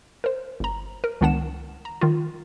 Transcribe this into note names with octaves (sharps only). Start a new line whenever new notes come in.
A#4 C5
G1 A#5
A#4
C#2 D#3 B3 D4 F#5 E7
A#5
D#3 F4